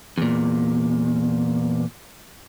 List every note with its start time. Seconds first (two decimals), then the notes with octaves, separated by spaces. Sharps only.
0.18 E2 A#2